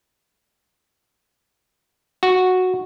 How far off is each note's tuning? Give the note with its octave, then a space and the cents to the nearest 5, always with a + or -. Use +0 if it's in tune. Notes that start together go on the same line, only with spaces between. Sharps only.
F#4 -5